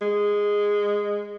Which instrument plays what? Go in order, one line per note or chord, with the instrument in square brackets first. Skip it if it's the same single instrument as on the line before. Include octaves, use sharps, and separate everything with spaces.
[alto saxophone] G#3